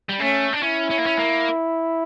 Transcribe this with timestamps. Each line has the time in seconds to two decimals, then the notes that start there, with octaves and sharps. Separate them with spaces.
0.09 G3
0.20 A3 C#4
0.53 D4
0.62 C#4 E4
0.90 C#4
0.98 A#3
1.06 C#4
1.18 A#3